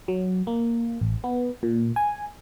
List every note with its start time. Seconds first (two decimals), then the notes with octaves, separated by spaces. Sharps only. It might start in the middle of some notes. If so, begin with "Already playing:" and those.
0.08 F#3
0.47 A#3
1.01 A1
1.24 B3
1.63 A#2
1.96 G#5